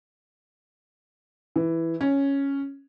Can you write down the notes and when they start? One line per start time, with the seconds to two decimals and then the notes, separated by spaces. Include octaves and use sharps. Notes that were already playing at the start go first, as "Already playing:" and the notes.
1.56 E3
2.01 C#4